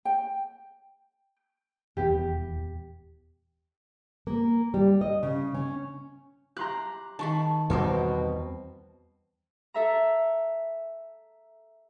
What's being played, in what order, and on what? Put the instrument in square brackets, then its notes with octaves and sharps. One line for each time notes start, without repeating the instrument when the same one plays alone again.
[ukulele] G5
[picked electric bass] D#1 E2 B3 [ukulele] G4
[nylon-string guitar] A#3
G3
D#5
C#3
C#4
[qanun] G4 [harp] A#5 C6 F#6
[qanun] D#3 G#3 B5 [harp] A5 C#6
[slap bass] E2 G3 C4 [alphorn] B2 [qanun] D#4 A#4 C5
[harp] A4 E5 A#5